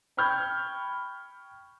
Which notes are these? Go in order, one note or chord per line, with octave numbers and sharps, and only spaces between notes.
G5 B5 C#6 F6 G6 G#6